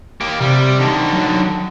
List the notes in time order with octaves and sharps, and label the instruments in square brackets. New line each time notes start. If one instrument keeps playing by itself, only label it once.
[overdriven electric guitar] A#3 G4
[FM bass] C3 [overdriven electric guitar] G3
[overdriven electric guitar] D3 D#3
[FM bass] F#3